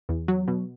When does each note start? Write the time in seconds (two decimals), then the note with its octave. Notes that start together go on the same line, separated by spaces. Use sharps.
0.09 E2
0.28 F#3
0.48 B2